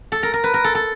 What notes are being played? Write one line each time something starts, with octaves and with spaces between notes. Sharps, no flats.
A4
A#4
A#4
B4
A#4
A4
A4